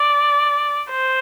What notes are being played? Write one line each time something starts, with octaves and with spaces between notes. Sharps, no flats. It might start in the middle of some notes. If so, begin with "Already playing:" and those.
Already playing: D5
C5